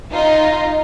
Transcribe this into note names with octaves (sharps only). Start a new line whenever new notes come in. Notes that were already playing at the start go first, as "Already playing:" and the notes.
D#4 F4